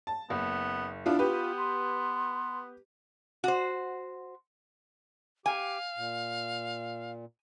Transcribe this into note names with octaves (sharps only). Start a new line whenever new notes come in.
A5
F#1 B3
B3 D4 E4 F4
B3 F4 G4 B4
C6
F#4 C5
G4 F5 G#5 D6
A#2